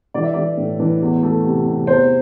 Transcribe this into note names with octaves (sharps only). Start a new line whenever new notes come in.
E3 D5
E5
E3 D5
A2
E3
E2
A3
C3
C3
E2 C5